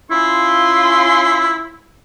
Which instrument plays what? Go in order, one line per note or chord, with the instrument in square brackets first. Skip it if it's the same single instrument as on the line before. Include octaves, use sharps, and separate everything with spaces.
[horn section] C#4 F4 C6 [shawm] E4